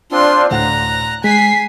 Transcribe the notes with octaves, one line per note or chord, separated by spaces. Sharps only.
C4 D4 F4 C6
D2 A2 F#5 A#5 F#6
G#3 G#5 B6 C7